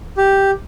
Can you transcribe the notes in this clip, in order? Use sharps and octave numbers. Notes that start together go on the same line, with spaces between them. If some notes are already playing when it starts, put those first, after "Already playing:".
G4